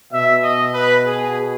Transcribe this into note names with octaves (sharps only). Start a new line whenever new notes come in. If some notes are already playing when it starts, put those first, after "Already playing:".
B2 E5
D#5
B4
G#4